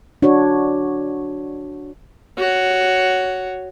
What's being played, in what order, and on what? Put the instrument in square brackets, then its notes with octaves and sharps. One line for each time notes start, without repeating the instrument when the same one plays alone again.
[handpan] D4 F#4 C#5
[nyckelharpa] F#4 C#5